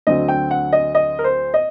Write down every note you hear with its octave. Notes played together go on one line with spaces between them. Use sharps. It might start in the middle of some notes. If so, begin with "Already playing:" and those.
D2 D3 F#3 C4 D#5
G5
F#5
D#5
D#5
A#4
C5
D#5